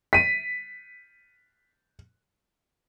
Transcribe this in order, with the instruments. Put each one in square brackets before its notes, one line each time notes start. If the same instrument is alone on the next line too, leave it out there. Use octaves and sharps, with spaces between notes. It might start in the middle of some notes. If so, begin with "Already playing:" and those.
[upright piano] B6 D#7